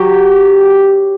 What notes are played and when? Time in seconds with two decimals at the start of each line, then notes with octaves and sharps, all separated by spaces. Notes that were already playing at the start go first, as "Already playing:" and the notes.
Already playing: F#3 G4